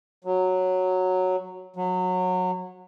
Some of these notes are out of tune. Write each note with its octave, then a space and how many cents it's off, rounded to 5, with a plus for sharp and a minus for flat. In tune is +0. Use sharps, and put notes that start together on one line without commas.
F#3 -5
F#3 -20